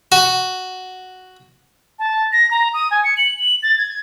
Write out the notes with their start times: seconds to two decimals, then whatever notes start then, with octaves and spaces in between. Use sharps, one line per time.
0.12 F#4
1.99 A5
2.33 A#6
2.51 A#5
2.74 D#6
2.91 G#5
3.04 C#7
3.17 F#7
3.39 F#7
3.63 A6
3.78 G#6